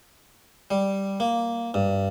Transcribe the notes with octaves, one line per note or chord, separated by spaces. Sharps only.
G3
A#3
G2